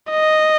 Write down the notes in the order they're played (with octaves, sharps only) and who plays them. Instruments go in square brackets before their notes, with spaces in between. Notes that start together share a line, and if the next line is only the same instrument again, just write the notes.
[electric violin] D#5